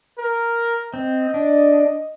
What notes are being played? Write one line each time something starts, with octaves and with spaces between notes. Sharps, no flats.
A#4
C4 D#5
D4